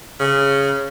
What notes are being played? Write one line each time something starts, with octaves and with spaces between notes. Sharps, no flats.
C#3